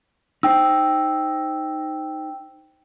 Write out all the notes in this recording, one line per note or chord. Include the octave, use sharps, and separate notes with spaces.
D#4 C5 G5 E6